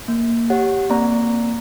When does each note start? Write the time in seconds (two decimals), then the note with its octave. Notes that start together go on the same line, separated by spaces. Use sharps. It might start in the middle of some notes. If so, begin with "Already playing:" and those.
0.08 A#3
0.50 G4 C#5 F#5
0.90 A#3 C4 D5 A#5